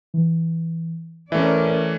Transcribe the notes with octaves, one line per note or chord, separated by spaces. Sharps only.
E3
E3 A3 C#4 A#4 D5 E5